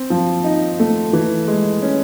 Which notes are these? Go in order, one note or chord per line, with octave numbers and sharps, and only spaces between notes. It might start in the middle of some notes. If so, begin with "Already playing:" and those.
Already playing: C4
F3
D#4
A3
E3
G#3
C#4